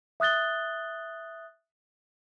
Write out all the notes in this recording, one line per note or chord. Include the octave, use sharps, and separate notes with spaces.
E5 D#6 F#6 A6 G7